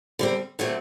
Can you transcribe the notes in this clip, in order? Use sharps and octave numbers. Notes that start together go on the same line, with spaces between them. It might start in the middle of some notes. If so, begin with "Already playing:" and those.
D3 G3 C4
D3 F#3 A3 C4